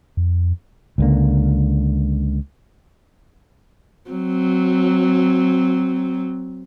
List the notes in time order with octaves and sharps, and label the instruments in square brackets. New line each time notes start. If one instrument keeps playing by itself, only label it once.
[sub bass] F2
[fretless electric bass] C#2 D3 A#3
[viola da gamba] F#3 C4